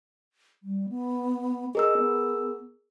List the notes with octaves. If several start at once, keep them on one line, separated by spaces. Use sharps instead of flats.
G3
B3
G#4 A#4 D#5 E6
B3